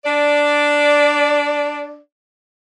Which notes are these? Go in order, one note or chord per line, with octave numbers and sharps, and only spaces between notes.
D4 D5